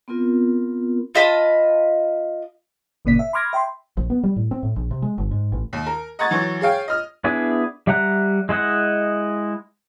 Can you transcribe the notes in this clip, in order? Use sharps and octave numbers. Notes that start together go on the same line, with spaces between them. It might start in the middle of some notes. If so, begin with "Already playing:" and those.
B3 C4 F4 A#4
F4 D#5 A5 B5
G1 A#2 C#3 A#3 D5 B6
E5
B5 C6 D6 F6 G#6 A#6
E5 G5 B5 C6
A#1
B3
G3
A2
C4
A2
A#1
C3
G#3
G1
G#2
A1
D#2
A#4
D#5 F#5 A#5 C#6 G#6 A6
E3 F#3 C#6
G#4 C#5 F5 G5
D#5 F6
B3 D4 E4 G#4 D5
G3 E5 F#5 A#5 F#6
G#3 E4 D#5 F#5